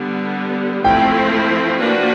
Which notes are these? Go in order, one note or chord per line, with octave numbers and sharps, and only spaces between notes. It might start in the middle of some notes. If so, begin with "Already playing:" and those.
Already playing: D3 G3 B3
F3 A3 C4 E4 G5
F3 A#3 D4 F#4 B4